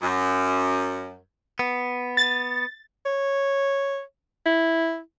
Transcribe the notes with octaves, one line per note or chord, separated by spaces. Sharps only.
F#2
B3
A6
C#5
E4